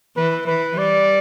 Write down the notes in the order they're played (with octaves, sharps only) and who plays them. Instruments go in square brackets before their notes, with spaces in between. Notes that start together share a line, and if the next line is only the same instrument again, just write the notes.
[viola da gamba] E3 [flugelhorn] B4
[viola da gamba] E3 [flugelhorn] B4
[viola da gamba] G3 [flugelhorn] D5